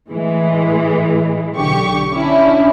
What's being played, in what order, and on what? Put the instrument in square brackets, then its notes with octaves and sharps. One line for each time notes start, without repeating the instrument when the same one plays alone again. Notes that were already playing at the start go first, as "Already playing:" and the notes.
[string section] A2 E3 G#3
B1 D3 G4 C#6
C#4 D4 E4